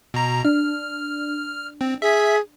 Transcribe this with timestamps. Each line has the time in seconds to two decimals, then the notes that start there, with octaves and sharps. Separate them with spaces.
0.14 B2 A#5
0.45 D4 F6
1.81 C4
2.02 G#4 E5 B6